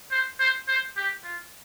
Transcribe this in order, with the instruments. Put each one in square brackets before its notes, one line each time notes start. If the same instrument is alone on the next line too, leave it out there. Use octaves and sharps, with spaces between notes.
[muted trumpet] C5
C5
C5
G4
F4